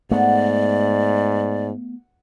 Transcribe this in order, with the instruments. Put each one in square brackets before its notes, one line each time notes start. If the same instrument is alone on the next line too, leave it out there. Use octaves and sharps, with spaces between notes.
[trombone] G#2 [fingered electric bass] A3 B3 [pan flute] D5 [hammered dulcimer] F#5